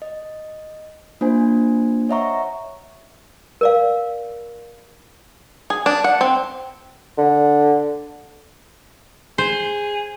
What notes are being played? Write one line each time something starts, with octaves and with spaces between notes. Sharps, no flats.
D#5
A#3 D4 F4 C5 G#5
C#5 D#5 E5 F#5 A#5 C#6
A#4 D5 F5
G#4
D4
F#5
C4
D3
G#4 C5